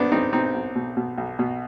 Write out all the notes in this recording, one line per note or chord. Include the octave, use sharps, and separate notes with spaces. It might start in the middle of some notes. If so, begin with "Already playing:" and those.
Already playing: B1 B3 C4 D4
B1 C4 D#4
B2 C4 D#4
B1
B2
B2
B1
B2